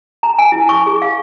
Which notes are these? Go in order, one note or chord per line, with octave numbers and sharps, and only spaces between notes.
A#5
G#5
E4
C#6
G#4
F5